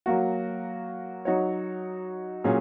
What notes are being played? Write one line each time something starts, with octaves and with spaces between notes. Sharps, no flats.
F#3 A#3 F#4
F#3 D#4 F#4 C#5
A#2 F#3 C#4 G#4